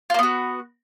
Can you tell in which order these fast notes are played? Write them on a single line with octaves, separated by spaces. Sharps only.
F4 A#3 B3 F#4